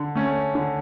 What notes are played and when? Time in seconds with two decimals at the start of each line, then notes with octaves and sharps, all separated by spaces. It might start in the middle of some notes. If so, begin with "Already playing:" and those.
Already playing: D3
0.15 A3 C#4
0.55 D3